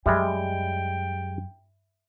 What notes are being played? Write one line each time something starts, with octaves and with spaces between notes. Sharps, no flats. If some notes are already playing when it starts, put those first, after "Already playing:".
F#2 G3 G#3 E5 G5 B5